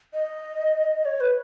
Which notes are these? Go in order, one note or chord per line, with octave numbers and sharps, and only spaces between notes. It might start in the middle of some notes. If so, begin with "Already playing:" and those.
D#5
C#5
B4